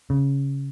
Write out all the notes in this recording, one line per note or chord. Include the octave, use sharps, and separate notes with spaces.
C#3